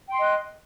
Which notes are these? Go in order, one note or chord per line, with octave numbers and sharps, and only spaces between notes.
D#5 G5 C6 F#6